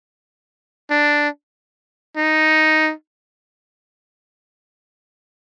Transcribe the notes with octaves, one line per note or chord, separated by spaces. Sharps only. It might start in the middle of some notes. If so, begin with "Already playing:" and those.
D4
D#4